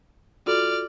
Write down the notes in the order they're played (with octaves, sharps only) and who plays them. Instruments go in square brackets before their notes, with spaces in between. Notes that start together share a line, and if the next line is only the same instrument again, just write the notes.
[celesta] F4 F#4 A4 [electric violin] D5 F6